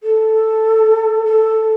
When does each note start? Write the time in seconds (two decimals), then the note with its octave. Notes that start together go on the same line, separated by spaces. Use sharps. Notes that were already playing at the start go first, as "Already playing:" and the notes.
0.03 A4
1.25 A4